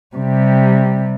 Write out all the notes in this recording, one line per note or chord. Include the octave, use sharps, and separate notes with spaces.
C3 G3